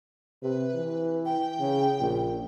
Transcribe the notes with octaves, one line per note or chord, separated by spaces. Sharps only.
C3 B4
E3
G5
C#3
A#1